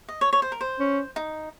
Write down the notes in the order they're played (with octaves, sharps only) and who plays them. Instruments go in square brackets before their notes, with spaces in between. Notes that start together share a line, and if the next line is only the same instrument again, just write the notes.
[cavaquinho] D#5
C#5
C#5
C5
A#4
C5
[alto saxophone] C#4
[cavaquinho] D#4